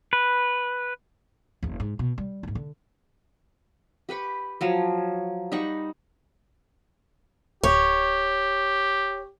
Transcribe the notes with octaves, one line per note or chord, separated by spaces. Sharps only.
B4
F#1 E2
G#2
B2
G3
A1 G#2
D3
G4 B4 B5 C#6
F3 F#3 C#5
G3 D#4 F#5 C#6
D1 G4 C#5